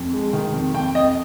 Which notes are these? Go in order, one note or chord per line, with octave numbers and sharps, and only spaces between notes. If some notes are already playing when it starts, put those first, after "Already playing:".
Already playing: F2
G#3
D#3
F2
F2 G5
F2 D#5